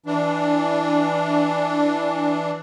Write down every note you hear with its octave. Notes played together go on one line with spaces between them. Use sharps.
E3 D4